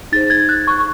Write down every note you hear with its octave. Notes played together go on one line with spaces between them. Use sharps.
D#4 G#4 C5 A6
G#6
F#6
C#6